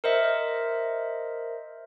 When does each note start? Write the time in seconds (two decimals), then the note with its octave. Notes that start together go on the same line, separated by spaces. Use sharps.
0.04 A#4 C5 D#5 E5